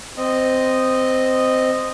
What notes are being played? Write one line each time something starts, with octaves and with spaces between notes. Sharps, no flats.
C4 D#5